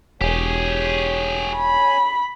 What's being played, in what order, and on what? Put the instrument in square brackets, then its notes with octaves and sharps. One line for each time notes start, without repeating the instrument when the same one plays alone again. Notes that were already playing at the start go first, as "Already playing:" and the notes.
[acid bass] E1 [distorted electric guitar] G4 G#4 [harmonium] C#5 G#5
[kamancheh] B5